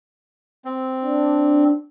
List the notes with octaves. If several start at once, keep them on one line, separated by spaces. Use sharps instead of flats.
C4
D4